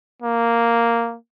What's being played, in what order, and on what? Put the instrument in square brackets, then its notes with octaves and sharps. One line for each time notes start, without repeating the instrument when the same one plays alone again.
[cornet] A#3